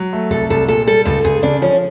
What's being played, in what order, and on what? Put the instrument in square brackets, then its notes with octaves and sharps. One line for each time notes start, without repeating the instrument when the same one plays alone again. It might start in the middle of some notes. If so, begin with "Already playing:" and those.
Already playing: [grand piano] F#3
A3
[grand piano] C2 [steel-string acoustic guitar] A4
[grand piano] C2 [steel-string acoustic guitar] A4
[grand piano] A#2 [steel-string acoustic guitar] A4
[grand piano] G3 [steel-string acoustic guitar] A4
[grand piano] C#2 [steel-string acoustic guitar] A4
[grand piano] C#2 [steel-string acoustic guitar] G#4
[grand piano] C#3 [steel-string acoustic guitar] D4
[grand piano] F3 [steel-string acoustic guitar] C#4